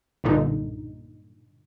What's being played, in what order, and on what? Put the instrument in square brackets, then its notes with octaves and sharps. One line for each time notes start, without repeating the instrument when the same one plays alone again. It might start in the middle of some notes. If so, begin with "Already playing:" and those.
[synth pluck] B1 G2 A#2 D3 D#4